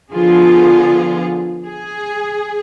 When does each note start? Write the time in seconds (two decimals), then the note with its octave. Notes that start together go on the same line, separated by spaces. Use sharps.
0.12 D3 F3 B3 F4 G#4
1.65 G#4